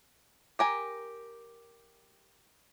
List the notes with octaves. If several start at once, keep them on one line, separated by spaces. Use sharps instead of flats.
G4 A#4 G#5